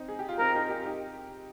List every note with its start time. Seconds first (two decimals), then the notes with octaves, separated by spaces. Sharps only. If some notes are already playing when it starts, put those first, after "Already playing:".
Already playing: C4 D#4
0.08 G#4
0.19 G4
0.29 F4
0.39 C4 D#4 A#4
0.55 D#4 G4
0.70 D#4 G4
0.86 D#4 G4